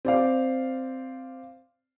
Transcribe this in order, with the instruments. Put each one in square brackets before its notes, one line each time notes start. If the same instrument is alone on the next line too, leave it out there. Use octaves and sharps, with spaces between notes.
[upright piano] C4 D5 F5